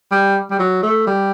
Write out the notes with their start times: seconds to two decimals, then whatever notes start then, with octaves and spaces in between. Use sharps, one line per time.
0.11 G3
0.51 G3
0.59 F#3
0.83 A3
1.07 G3